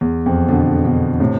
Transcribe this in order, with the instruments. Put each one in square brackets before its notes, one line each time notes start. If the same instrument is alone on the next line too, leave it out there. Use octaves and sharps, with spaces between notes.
[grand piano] E2
F2
B2 D3
B2 D3
A2 C3